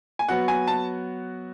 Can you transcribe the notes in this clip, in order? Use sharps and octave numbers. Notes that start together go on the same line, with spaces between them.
G#5
F#3 B3 F#4 F#5
G#5
A5